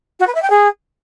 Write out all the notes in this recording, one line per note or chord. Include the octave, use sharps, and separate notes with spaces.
F#4
B4
E5
G5
G#4